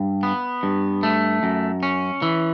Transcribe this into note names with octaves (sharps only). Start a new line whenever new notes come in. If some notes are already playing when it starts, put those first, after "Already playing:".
Already playing: G2
B3
G2
A3
F#2
C#4
E3